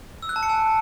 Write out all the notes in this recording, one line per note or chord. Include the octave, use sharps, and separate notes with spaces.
E6
F#6
A5
C#7
G#5